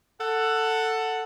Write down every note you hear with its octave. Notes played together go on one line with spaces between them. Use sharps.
A4 F#5